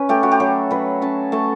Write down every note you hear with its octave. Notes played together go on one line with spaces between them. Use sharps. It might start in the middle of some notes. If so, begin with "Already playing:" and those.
Already playing: C#4 B4
A3 G4
F#4
G4
F#3 A4
F#3 B4
C#4 A5
A3 A5